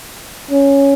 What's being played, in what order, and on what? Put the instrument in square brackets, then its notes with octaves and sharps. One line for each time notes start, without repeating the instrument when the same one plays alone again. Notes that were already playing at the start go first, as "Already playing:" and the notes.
[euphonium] C#4